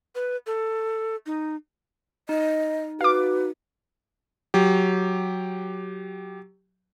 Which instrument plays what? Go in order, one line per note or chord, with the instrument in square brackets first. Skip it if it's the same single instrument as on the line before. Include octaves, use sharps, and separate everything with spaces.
[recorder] B4
A4
D#4
[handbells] D#4 [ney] D#5
[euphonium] F#4 [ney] B4 [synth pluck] F5 D6
[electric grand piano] F#3 G4